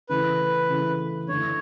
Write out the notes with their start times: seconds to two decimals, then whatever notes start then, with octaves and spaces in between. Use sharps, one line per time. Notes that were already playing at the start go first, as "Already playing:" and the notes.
0.09 C#3 E3 A3 B4
0.70 C#3 E3 A3
1.28 D3 A3 E4 C#5